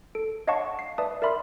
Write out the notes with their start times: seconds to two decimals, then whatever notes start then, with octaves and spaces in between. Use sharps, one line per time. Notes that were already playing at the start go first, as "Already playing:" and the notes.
0.15 A4 D7
0.47 C#5 D#5 F5 F#5 A5 C#6
0.79 C7
0.98 B4 D5 E5 A5 D#6
1.22 A#4 D5 E5 B5 C6 F6